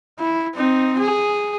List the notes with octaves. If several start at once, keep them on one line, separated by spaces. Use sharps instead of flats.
E4
C4 D#4
G#4